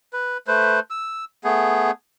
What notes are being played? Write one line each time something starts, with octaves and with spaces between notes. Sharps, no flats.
B4
A3 B4 C5
E6
A3 B3 G#4